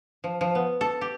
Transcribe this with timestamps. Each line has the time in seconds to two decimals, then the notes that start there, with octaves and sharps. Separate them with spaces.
0.24 F3
0.41 F3
0.55 B3
0.81 A4
1.01 G4